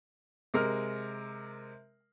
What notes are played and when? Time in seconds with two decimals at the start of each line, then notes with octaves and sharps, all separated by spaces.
0.54 C3 G#3 A#4 F6